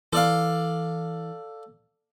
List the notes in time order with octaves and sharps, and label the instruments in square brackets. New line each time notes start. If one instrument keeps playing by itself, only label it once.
[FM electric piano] E3 [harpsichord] A4 D5 F5